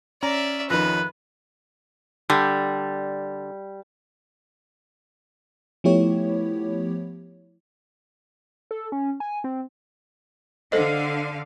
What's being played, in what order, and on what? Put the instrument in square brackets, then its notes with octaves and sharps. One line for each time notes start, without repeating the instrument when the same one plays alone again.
[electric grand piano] C#4 [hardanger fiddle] D5 E5 [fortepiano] A#5
[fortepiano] F2 D#3 [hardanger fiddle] B4 [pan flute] F#6
[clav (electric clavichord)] D3 [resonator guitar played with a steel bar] G3
[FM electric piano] F3 A3 B3 E4 G4 C#5
[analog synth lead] A4
C#4
G#5
C4
[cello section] D3 F5 [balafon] A4 C5 D#5